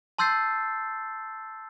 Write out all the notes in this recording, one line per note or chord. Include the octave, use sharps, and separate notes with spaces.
A5 C6 E6 G6 A6 C7